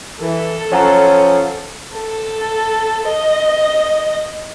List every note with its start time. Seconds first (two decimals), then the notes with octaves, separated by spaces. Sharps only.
0.22 E3 A4
0.72 F3 C#4 C#5 F#5 A#5
1.94 A4
3.06 D#5